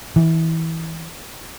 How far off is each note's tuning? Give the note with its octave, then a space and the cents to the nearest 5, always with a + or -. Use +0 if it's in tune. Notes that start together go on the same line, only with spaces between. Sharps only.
E3 -25